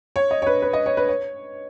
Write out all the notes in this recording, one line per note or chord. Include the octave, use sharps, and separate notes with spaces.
C#5
D#5
C#5
B4
B4
D#5
C#5
B4
C#5